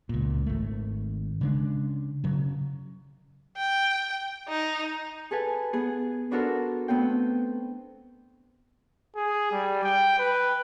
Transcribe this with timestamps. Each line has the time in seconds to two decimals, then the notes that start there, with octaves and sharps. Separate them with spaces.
0.09 C#2 A#2
0.46 G#1 A3
1.41 C#3 G#3 D4
2.24 C#3 F#3
3.57 G5
4.48 D#4
5.31 G#4 A4 B4 G#5
5.73 B3 G#4
6.31 B3 D4 F#4 A4 A#4 C5
6.88 A3 B3 C4 C5 G5
9.16 G#4
9.52 G3
9.83 G5
10.18 B4